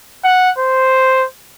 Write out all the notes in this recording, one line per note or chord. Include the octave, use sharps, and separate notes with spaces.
F#5
C5